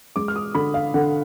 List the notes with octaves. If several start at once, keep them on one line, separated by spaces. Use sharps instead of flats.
G#3 D6
F6
D#6
D3 B5
F5
D3 F#5